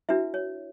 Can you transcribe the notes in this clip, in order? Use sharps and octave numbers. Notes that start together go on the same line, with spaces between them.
D4 E4 F#4 B4 E5
C#5